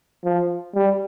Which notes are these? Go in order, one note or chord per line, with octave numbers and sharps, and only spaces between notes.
F3
G3